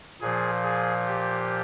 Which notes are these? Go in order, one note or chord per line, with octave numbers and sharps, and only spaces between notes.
A#2 F3 G#4
G#4
G4